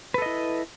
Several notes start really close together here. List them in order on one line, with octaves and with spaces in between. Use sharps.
B4 A4 D#5 E4